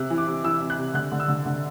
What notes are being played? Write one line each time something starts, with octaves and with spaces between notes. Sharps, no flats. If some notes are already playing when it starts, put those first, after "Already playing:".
Already playing: C3 F#6
E3
D6
C3
E3 E6
C3
F#6
C3
D3 F#6
D3
E6
D3
D3